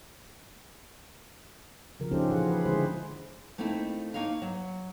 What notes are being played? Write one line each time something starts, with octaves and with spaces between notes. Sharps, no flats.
C#3 F3 A#4
C#4 D#4 F4 G4 A4 C5
A#2 E3 F3 F4 G#4 F#5
B4
D3 G#3 E4 G4 G#4 C5
A3 A#3 C4 D#4 E4
A#3 D#4 C#5 F5
F#3